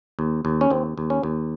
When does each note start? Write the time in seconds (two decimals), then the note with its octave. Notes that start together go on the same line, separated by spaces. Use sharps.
0.19 D#2
0.45 D#2
0.61 C#4
0.70 D#2 C4
0.98 D#2
1.10 C#4
1.23 D#2